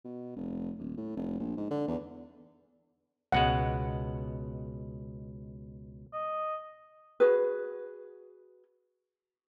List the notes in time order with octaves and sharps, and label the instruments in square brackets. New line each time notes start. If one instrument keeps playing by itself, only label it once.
[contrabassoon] B2
F1
D#1
A2
F1
A#1
G#2
D3
E2
[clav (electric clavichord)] C#2 B2 G#3 [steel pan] F#5
[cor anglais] D#5
[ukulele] F#4 G#4 B4